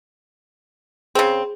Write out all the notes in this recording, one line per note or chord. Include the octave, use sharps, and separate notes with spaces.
C#3 C4 G#4